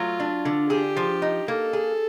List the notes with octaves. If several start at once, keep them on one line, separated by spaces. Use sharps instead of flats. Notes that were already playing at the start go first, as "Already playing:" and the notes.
Already playing: F#3 A3 F4
D4
D3
G4 G#4
F3
D#4
A#3 A4
G#4